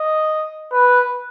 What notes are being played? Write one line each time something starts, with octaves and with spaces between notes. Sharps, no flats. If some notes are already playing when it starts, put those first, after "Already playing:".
Already playing: D#5
B4